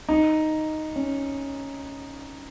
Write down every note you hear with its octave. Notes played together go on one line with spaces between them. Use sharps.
D#4
C#4